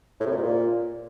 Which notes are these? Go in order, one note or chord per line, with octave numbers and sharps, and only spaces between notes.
A2
C3
A#2
G#2
A#2